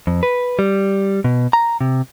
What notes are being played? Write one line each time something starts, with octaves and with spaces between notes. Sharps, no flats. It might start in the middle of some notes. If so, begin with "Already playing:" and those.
F2
B4
G3
B2
A#5
C3